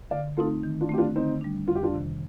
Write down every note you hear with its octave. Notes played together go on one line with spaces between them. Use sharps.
D3 D5 F5
A3 C4 D#4 F4 A4
D#3
D4 F4
A3 C4 G4
D4 F4
D3 C4 D#4
G3 D4
F2 F4
G4
D4 F4
C3 D#3